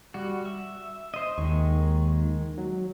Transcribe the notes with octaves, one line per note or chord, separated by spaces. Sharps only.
G3 F#4
E5
C5 D#5
D#2 D#3 G#3 C#6
F#3